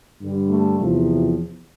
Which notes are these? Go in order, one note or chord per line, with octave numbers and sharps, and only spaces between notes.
G2 D3 G3
A3
E2 C3 F3